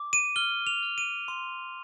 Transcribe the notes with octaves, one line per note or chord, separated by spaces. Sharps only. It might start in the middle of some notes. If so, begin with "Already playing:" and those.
Already playing: D6
D#7
F6 G7
F7
F6
D#7
C6